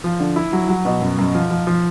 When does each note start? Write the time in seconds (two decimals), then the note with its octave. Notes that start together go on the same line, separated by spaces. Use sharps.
0.04 F3
0.20 D3
0.36 E4
0.53 F#3
0.69 F#3
0.85 B2
1.01 F#2
1.18 F#2
1.35 F3
1.51 F3
1.67 F3